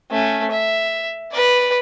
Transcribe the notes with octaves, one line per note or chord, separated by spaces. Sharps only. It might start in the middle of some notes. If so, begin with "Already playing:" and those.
A3 C#4
E5
B4 D5